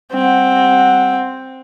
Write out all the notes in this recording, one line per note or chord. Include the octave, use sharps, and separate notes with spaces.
G3 C4 F#5